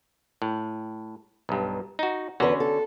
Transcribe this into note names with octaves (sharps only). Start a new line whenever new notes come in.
A2
B1 G2
D#4 F#4
E2 D3 C#4 F#4 B4
A4